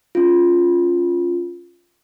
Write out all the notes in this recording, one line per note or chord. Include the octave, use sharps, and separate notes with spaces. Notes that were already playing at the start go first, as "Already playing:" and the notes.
C#4 F4